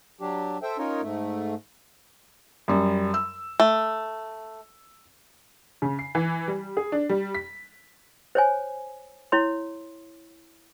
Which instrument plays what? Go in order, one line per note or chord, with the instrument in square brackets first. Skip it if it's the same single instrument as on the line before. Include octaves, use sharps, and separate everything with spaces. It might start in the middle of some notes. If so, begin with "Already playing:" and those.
[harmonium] F#3 D4 G4
A4 C5 E5 G5
C#4 D#4 F4 A#4 C#5
G#2 A3
[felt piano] F#2 G3
E6
[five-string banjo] A3
[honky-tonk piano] C#3
C7
E3
G3
G#4
D4
G3
B6
[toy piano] C5 C#5 G#5
E4 C#5 C6